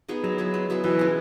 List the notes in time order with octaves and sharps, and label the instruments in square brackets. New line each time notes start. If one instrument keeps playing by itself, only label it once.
[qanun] B3 D#4 G#4
[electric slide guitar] F#3 [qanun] G#3
[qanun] B3 E4 G#4
G#3
B3 E4 G#4
[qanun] B2 [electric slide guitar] E3
[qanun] G#3 C#4